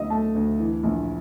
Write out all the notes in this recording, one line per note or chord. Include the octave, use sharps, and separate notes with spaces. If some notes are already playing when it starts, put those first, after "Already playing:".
Already playing: D2 F#3 D#5 E5
A3 A5
D2
E3
A#1